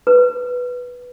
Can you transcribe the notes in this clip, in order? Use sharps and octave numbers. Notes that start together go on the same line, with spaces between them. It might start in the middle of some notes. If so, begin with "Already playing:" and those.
B4